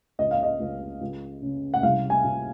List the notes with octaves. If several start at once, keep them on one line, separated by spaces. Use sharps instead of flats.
C#2 D#5
F5
D#5
C#2
C#2
C#3
F#5
C2 F5
G#5
A#2